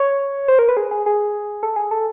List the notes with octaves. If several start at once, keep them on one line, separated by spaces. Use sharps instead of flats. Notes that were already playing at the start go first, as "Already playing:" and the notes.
Already playing: C#5
C5
A#4
B4
G#4
G#4
G#4
A4
G#4
A4